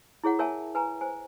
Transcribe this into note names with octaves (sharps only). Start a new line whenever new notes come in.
E4 G#4 C#5 F#5
A#4 C#5 E5 G#5 A5
B4 G#5 A#5
C5 G#5